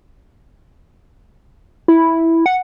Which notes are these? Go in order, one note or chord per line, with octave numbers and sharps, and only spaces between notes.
E4
F#5